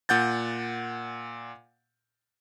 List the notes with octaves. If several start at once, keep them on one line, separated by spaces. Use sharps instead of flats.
A#2 F#5 G6 A6